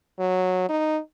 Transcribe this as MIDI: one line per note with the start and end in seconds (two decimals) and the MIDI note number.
0.19 0.66 54
0.69 0.99 63